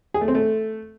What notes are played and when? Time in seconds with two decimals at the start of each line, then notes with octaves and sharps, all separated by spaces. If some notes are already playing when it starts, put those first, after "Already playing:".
0.14 G#4
0.21 A3
0.28 C4
0.35 A3